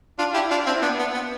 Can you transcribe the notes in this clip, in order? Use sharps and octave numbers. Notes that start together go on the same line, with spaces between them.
D4 F4
E4 G4
D4 F4
C4 E4
B3 D4
B3
B3